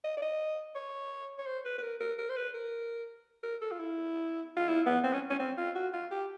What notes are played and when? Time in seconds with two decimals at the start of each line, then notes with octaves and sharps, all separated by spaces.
0.04 D#5
0.17 D5
0.22 D#5
0.75 C#5
1.38 C#5
1.46 C5
1.65 B4
1.78 B4
1.82 A#4
2.00 A#4
2.18 A#4
2.29 C5
2.36 B4
2.54 A#4
3.43 A#4
3.61 A4
3.72 F4
3.79 E4
4.57 F4
4.68 E4
4.86 B3
5.04 C4
5.13 C#4
5.30 C#4
5.39 C4
5.57 F4
5.75 F#4
5.93 F4
6.11 G4